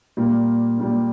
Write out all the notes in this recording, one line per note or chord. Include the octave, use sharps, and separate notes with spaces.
A#2 G3 A#3
A#2 G3 A#3